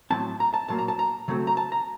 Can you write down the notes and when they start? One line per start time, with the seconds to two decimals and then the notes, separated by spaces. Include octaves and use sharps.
0.10 A2 F#3 C4 A5
0.40 A#5
0.54 A5
0.68 A#2 F#3 A#3 A5
0.78 A#5
0.88 A5
0.99 A#5
1.28 C#3 F#3 A3 C4
1.47 A#5
1.57 A5
1.72 A#5